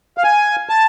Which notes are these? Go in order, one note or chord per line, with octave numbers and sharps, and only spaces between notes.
F5
G#5
A5